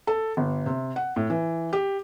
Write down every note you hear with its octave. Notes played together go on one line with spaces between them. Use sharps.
A4
G1
C3
F#5
A2
E3
G4